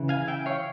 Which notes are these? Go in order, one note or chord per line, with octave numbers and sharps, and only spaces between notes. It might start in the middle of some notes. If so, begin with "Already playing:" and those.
Already playing: C#3 E3
F5 G#5
E5 G5
C#5 F5